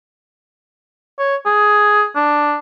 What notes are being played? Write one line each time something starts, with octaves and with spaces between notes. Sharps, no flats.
C#5
G#4
D4